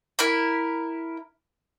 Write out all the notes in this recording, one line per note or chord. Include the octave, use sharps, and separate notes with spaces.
E4 A#4 B5